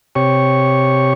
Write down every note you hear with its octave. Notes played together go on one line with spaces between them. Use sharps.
C3 G4 C#5 C#6